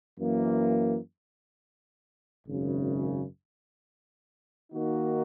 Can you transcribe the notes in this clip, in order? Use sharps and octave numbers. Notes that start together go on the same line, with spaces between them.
F#2 E3 A#3
G#1 F#2 C#3
D#3 A#3 D#4 F#4